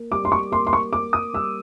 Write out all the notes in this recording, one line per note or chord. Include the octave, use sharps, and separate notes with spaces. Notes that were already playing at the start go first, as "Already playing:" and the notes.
Already playing: A#3
G3 D6
C6
C#6
A#3 C6
C6
C#6
A#3 D6
D#6
G3 E6